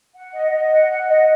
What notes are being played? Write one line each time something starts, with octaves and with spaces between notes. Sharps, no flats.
F#5
D#5
D#5
F#5
F#5
D#5